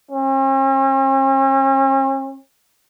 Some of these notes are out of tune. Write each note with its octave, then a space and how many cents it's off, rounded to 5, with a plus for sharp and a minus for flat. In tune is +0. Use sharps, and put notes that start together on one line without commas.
C#4 -45